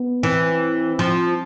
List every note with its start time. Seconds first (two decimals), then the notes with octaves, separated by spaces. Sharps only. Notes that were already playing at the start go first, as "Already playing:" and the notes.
Already playing: B3
0.23 E3 C4
0.99 F3